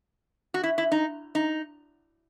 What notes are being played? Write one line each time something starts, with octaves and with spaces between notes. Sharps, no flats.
F#4
E4
E4
D#4
D#4